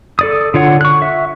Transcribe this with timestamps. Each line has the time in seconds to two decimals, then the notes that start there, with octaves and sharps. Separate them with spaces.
0.19 A4 D5 D#6
0.54 D3 F4 C#5 F#5
0.81 C#6 F#6
1.02 E5